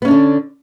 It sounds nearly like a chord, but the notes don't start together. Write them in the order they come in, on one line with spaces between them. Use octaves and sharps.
B3 C#4 D4 D3